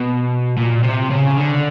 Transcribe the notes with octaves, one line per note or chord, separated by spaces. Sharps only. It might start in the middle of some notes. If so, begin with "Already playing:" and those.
Already playing: B2
A#2
C3
C#3
D3